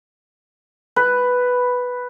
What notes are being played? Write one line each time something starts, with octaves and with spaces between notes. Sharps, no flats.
B4